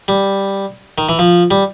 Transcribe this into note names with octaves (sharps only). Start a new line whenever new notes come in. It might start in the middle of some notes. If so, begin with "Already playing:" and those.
G3
D#3
E3
F3
G3